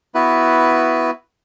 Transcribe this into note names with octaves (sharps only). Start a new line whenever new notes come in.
B3 E4 F#4 B4